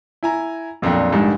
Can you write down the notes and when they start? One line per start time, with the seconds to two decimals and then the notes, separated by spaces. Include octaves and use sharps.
0.23 E4 G#5 A#5
0.82 B1 F2 A#2 D4 G5
1.12 A#1 G#2 D3 G3